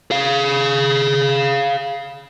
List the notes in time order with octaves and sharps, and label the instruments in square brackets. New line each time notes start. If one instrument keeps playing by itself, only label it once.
[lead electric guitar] G#4 F5